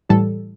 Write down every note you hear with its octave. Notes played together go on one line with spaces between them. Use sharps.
A2 E3 G3 A4